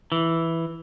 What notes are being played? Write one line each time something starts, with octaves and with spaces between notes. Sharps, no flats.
E3